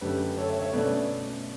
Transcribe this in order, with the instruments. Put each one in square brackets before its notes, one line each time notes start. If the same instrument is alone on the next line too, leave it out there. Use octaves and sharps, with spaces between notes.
[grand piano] F#2 D3 A3 C#4 G4 B4
A4 C#5
C#5 E5
C#5 E5
B2 A3 C#4 B4 D5